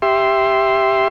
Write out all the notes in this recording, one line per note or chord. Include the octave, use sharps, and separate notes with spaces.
G4 E5 C6